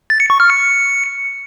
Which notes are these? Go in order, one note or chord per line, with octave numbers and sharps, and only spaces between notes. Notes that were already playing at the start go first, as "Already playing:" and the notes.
A6
C#7
C#6
F6
C#7